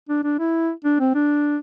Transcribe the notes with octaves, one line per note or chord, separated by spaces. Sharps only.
D4
D4
E4
D4
C4
D4